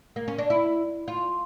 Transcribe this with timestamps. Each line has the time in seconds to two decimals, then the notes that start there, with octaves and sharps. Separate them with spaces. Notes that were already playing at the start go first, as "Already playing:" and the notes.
0.16 A#3
0.28 C#4
0.38 D4
0.50 E4
1.08 F4